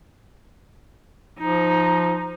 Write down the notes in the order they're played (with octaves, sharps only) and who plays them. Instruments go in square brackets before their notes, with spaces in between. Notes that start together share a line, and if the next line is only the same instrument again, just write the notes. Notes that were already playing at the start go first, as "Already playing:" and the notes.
[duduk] F3 [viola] D#4